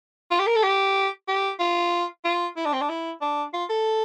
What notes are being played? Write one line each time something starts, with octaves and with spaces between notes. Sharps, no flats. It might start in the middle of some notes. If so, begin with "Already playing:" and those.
F4
G4
A#4
A4
G4
G4
F4
F4
E4
D4
C4
D4
E4
D4
F4
A4